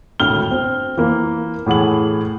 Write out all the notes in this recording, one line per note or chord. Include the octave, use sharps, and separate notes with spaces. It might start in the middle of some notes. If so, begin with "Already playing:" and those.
G#1 D2 A2 G5 F6 G7
C4
E3 A#3
A2 E3 G#4 F#5 F#7